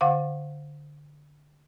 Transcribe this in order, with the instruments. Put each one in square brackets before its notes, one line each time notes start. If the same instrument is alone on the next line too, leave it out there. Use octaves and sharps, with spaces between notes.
[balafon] D3 F5 F#5 D6